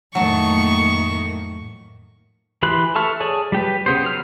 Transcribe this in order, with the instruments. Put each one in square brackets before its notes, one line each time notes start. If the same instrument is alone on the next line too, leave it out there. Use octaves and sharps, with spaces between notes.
[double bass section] F2 A2 A#3 [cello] D#3 A3 [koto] F#3 A5 [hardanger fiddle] C#6
[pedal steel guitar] E3 G4 B5 C6 F#6
A4 E5 A5 C#6 F6
G#4 C#5 D5 A5
G3 G4 B4
C#3 B3 C5
F#3 F6